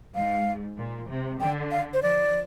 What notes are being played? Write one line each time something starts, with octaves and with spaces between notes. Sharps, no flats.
G#2 F5
A#2
C3
D3 G5
F5
C5
F3 D5